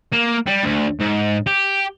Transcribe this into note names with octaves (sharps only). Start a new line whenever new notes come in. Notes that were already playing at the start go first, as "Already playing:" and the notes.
A#3
G3
D2
G#2
G4